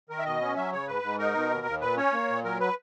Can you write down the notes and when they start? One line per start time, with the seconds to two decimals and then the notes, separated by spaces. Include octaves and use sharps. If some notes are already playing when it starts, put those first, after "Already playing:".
0.09 D#3 A#4
0.19 E5
0.25 B2 D#5
0.41 C#4
0.56 F#3 E5
0.72 C#3 C#5
0.87 G#2 B4
1.03 G#2
1.19 D#4 A#4
1.35 B2
1.51 D#2
1.66 D#2
1.81 A#2 B4
1.97 C#4 C#5
2.13 A#3
2.29 A#2
2.44 F#3 A#4
2.60 B4